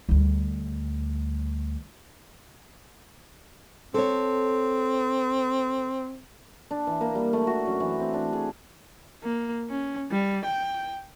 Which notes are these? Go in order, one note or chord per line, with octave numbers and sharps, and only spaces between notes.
D2 G3
C4 A4 C#5
D4
E3
A#3
G3
A3
F#4
F#2
E3
C4
D4
G#4
A#3
C#4
G3
G5